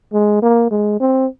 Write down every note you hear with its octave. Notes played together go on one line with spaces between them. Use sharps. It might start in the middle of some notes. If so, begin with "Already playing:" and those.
G#3
A#3
G#3
C4